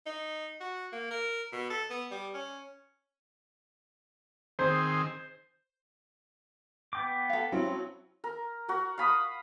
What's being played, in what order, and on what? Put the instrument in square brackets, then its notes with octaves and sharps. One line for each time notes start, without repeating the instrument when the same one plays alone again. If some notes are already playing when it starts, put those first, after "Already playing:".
[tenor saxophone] D#4
F#4
A#3
A#4
B2
A4
B3
G3
C#4
[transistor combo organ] D#3 C4 G#4 [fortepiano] C5
[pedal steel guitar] B3 G5 D6
[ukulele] A4 F5
[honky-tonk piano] F#3 C#4 E4 [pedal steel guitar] C4
[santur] A#4
F#4 A#4
F5 B5 D#6